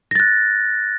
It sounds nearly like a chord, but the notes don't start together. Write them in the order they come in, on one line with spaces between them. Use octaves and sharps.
A#6 A6 F#6